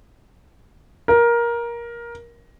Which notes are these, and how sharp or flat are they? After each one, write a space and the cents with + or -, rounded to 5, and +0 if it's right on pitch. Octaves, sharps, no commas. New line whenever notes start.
A#4 +15